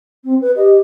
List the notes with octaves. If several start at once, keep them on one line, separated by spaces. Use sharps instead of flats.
C4
B4
G4 D#5